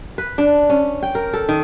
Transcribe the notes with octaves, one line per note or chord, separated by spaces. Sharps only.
B4
D4
C#4
G5
A#4
A4
D#3